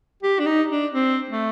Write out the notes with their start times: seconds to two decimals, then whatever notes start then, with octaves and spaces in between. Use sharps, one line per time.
0.23 G4
0.40 D4
0.46 D#4
0.70 D4
0.94 C4
1.29 A3